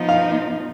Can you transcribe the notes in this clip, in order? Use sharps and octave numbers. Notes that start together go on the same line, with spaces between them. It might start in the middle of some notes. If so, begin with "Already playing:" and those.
Already playing: F3 B3 D#4
F5